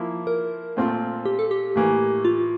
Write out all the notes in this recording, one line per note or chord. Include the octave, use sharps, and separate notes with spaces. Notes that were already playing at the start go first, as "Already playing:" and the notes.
Already playing: F3 A#3 E4
A#4
A#2 A3 C4 F4
G4
A4
G4
A2 E3 A#3
F4